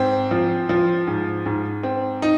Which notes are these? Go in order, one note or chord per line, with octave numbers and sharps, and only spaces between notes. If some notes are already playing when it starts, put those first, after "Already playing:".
Already playing: G#2 C4
F3
F3
G#2
G#2
C4
D#4